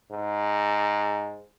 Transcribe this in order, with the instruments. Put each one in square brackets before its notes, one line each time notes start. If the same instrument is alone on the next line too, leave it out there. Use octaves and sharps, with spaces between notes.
[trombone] G#2